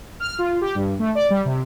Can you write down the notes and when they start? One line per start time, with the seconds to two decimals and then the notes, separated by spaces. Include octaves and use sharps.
0.20 F6
0.39 F4
0.61 G4
0.75 G2
0.99 A3
1.15 D5
1.30 G3
1.45 C3